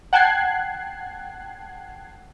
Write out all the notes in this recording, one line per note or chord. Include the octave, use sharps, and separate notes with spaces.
F#5 G5 A5 F#6 G#6 C7